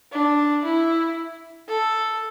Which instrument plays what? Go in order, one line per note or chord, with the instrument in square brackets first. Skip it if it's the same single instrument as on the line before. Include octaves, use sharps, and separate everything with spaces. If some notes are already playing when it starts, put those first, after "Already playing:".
[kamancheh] D4
E4
A4